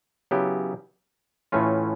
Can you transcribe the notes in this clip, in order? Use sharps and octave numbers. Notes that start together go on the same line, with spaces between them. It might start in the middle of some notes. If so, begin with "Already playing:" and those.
C#3 F#3 B3 E4 G4
A2 E3 A3 C#4 F4